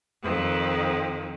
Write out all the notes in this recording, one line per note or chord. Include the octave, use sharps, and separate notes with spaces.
F2 D#3